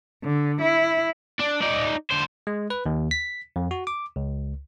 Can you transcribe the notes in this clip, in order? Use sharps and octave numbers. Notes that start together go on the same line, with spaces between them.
D3
E4
D4
D#4 D5
D3 C5
G#3
B4
D#2
B6
F2
F#4
D6
C#2